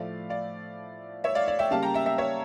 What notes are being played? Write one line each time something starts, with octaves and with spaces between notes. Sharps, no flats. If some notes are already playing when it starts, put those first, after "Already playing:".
Already playing: A2 F3 A3 D5 F5
D5 F5
C#5 E5
D5 F5
D5 F5
E5 G5
C#3 G3 A#3 F5 A5
G5 A#5
E5 G5
E5 G5
C#5 E5